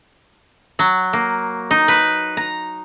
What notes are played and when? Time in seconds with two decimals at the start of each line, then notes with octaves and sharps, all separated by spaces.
0.79 F#3
1.13 A#3
1.71 D#4
1.88 B4
2.37 A#5